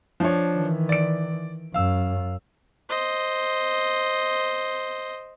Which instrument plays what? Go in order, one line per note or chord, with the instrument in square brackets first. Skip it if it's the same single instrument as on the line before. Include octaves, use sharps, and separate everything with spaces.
[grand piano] F3 D4 C#5
[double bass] D#3 E3
[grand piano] D5 D7
[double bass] F#2 [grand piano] F5 E6
[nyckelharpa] C5 D#5